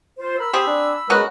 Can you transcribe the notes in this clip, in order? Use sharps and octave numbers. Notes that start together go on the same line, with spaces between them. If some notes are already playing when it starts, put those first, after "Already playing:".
F4 C5
A#4 B5 E6
C4 G4 G#4
D4
G#3 B3 C#4 F#4 A#4 B4